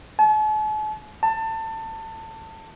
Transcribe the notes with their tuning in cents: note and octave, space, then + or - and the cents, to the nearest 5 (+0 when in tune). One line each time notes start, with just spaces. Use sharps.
A5 -45
A5 +25